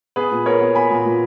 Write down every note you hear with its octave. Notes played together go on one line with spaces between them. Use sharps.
B3 G#4 B4
A#2
B3 A#4 C#5
B3
B3 G#5 B5
A#2
A#2